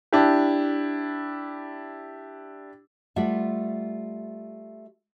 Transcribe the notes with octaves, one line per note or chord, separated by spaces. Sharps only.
D4 E4 G4
G3 A3 F4 E5 F#5